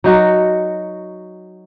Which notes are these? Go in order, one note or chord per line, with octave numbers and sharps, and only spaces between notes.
F#3 D#4 F#4